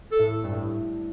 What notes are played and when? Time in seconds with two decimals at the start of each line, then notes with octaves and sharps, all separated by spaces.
0.12 A4
0.19 A2
0.44 G2
0.52 A2